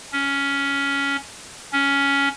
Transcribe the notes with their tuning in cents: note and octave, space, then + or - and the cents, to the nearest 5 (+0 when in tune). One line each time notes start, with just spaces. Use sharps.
C#4 +10
C#4 +10